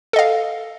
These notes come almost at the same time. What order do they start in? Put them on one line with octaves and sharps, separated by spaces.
A4 D#5 F5